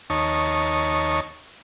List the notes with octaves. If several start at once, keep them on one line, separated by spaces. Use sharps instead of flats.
D#2 D#4 C#5 A5 C#6